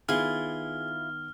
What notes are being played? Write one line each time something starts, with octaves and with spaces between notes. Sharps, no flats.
D#3 B3 E4 F4 G#4 F6